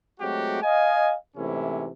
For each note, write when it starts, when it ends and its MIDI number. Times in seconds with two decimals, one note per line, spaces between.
0.20 0.60 54
0.20 0.60 56
0.20 0.60 57
0.20 0.60 60
0.20 0.60 66
0.20 0.60 67
0.61 1.14 75
0.61 1.14 77
0.61 1.14 80
1.36 1.88 44
1.36 1.88 48
1.36 1.88 52
1.36 1.88 57
1.36 1.88 61
1.36 1.88 64